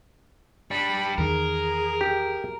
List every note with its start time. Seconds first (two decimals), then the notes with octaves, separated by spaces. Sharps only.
0.71 G3 D4 B5
1.18 E2 D#3 G#4 A#4
2.01 G4